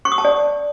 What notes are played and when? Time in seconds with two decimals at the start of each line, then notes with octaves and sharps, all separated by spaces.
0.05 C#6
0.12 D#6
0.18 A5
0.25 D5